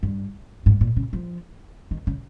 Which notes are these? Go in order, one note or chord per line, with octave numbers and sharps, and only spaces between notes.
G2
G#2
A#2
C#3
F3
D#3
C#3